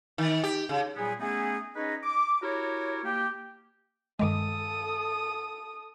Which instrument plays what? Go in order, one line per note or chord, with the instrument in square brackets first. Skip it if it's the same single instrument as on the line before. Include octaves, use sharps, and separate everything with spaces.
[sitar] D#3
G4
C#3
[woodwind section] A#2 F#3 G3 B3 G#4
A3 B3 C#4 D#4 E4 G#4
C#4 D#4 G#4 B4 C#5 D#5
D6
E4 F#4 G4 A#4 C#5
A#3 G4
[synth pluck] G2 D#3 G#3 [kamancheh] A4 D#6